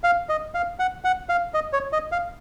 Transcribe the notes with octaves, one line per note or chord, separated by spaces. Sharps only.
F5
D#5
F5
F#5
F#5
F5
D#5
C#5
D#5
F5